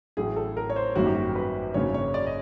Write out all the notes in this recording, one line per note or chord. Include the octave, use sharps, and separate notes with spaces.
A1 A2 F#3 G#4
A4
A#4
C#5
C5
G#1 F#2 D#3 G3 A#3 F#4
G4
F#4
B4
G#1 F#2 C#3 F#3 A#3 C#5
C#5
D5
D#5